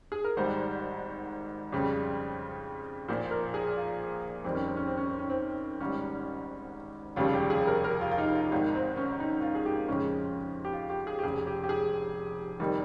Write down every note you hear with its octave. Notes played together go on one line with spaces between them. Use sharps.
G#4
A#4
G#1 G#2 G3 C5
F2 C#3 G3
A#1 A#2 F3 C5
A#4
G#4
F4
F2 D#3 G3 C4
C#4
C4
C#4
C4
C#4
C4
C#4
C4
G#1 G#2 G3 C#4
F1 D#2 C#3 G3 F4
G4
G#4
A#4
A#4
F4
F4
D#4
F4
G#1 G#2 D#3 D#4
C4
C#4
D#4
F4
G#4
G4
F2 C#3 F3 G#3 C#4
G4
F4
G4
G#4
G4
F1 F2 C#3 G#4
G4
G4
G#4
F1 F2 D#3 G3